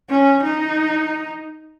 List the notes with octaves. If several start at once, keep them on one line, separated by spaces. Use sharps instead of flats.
C#4
D#4